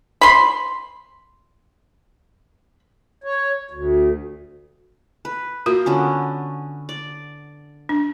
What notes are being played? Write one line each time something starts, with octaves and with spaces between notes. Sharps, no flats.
B5 C6
C#5
D2
B4
A#3 F4 F#4 A#4
D3 B3 C#4
D5
D4